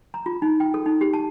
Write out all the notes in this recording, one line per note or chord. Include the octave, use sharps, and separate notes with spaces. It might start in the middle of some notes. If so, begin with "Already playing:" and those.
A#5
F4
D#4
G5
A4
D#4
G4
A5